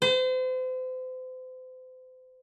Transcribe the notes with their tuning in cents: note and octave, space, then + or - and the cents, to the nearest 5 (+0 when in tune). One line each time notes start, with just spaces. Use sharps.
C5 -35